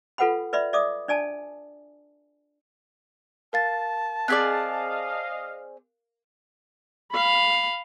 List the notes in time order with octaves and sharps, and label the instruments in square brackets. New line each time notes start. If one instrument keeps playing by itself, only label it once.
[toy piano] F4 A4 B4 F#5 G5 B5
B4 D5 E5 B5
D5 E5 D6 D#6
D4 D5 G#5 A5
[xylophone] A#4 F5 A6 [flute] A5
[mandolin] C4 G#4 D5 [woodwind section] D#5 F5 [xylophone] F#6 B6
[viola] F5 B5